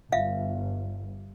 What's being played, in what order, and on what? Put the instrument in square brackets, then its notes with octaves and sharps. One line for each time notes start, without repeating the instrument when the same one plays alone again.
[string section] G1 [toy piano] F4 E5 F5